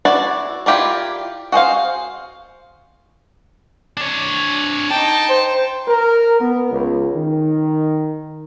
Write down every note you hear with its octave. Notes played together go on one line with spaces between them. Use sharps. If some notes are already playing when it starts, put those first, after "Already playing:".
E4 F#4 D5
E4 F4 G4 A#4 D5
F#4 G#4 C5 F5
D4 C#5
D#4 G5 A5
C5
A#4
B3
C#2
D#3